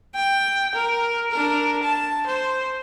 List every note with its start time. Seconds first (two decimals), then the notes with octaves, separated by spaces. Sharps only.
0.15 G5
0.75 A#4
1.31 D4 A#4
1.83 A5
2.27 C5